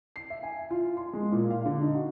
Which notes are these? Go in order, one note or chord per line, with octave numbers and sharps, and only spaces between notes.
C7
E5
G#5
F4
C6
G#3
A#2
F5
D3
D#4
F#4